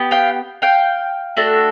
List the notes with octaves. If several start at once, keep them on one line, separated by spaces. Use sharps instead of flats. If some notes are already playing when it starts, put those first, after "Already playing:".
Already playing: B3 G4
F5 G5
F5 G5
A3 D4 F#4 A4